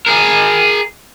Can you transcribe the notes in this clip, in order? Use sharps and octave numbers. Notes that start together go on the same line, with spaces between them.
G#4 A#4